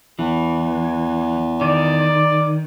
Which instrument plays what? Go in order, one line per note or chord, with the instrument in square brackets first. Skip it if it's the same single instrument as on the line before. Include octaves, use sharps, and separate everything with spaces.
[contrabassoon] E2 [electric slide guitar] E3
[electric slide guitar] D#3 [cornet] D5